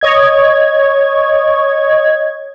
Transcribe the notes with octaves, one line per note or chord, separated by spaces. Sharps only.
C#5 D#5 G#6